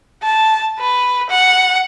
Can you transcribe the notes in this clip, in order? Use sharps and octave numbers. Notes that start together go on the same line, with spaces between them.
A5
B4
F#5